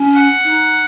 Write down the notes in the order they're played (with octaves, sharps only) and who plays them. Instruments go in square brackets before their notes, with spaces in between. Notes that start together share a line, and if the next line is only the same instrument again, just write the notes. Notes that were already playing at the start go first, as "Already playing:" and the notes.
Already playing: [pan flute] C#4
[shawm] F#5
[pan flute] D#4